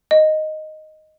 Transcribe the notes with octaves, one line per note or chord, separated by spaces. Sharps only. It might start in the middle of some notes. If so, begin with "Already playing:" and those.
D#5